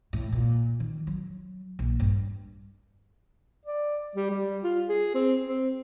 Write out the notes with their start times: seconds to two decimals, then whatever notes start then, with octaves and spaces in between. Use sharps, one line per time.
0.13 A2
0.32 A#2
0.80 D#3
1.07 F#3
1.79 A#1
2.00 G2
3.65 D5
4.16 G3
4.30 G3
4.64 F4
4.89 G#4
5.15 C4
5.47 C4